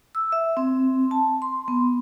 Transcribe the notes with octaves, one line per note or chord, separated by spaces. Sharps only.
E6
E5
C4
A5
C6
B3